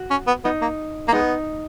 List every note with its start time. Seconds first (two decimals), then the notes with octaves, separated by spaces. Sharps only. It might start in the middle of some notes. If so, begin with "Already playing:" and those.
Already playing: F#4
0.11 C#4
0.27 B3
0.44 B3 D#4
0.61 A#3
1.08 A#3
1.12 G#3 B3 D#4